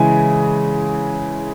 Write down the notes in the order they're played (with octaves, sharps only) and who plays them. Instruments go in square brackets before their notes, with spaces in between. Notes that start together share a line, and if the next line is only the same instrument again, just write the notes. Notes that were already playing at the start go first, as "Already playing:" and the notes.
Already playing: [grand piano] C#3 E3 G#3 E4 G#5